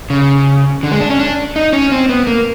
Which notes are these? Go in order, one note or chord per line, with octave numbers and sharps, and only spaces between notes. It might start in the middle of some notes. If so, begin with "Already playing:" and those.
C#3
D3
G#3
D4
C#4
D4
D#4
C#4
C4
B3
A#3